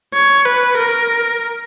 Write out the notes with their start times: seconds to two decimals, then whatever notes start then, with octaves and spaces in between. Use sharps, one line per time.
0.14 C#5
0.45 B4
0.77 A#4